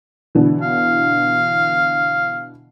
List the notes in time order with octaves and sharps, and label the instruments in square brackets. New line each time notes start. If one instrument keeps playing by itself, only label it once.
[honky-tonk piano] B2 D3 E3
[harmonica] F5